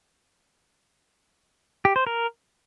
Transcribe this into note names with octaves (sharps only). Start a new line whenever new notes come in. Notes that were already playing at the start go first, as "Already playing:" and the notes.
G4
C5
A#4